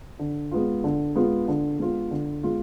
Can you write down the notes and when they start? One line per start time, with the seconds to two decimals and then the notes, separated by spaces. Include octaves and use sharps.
0.19 D3
0.51 G#3 B3 F4
0.84 D3
1.15 G#3 B3 F4
1.48 D3
1.79 G#3 B3 F4
2.11 D3
2.43 G#3 B3 F4